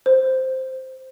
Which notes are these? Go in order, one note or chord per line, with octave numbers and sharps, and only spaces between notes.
C5